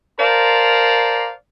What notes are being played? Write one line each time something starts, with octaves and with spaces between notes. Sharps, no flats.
A#4 C5 D5 F5 A5 A#5